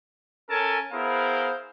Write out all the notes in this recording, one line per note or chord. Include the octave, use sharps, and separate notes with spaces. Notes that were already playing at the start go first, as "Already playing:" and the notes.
C#4 A4 A#4 G#5 A5
B3 E4 G#4 A#4 C5 F5